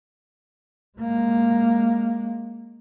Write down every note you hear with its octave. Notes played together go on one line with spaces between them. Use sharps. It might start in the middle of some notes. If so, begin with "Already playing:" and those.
G#3 A#3